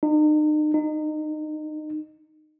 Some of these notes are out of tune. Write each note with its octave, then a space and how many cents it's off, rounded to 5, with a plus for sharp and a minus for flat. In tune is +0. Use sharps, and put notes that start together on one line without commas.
D#4 -40
D#4 -25